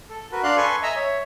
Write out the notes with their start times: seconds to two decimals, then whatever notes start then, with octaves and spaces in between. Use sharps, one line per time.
0.10 A4
0.32 F#4 A#4 B4
0.43 D4 D5 F5 C6 F#6
0.57 A4 B4 G#5 C6 C#6
0.83 D#5 E5 G#5 A#5 E6
0.96 C#5 E5